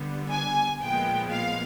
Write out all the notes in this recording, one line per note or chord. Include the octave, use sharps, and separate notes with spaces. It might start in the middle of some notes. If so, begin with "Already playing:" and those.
Already playing: D3 G3 B3
G#5
A#2 F3 G#3 B3 G5
F5